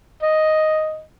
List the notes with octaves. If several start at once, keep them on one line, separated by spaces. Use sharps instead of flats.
D#5